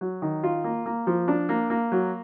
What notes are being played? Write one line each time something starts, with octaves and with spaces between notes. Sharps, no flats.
F#3
D#3
F4
A#3
A#3
F3
D4
A#3
A#3
F#3